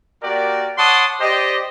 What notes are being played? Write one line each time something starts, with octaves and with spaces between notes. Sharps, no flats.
A#3 F#4 G4 A#4 D5
C#5 F#5 A5 C6 D6 D#6
G4 C5 D5 D#5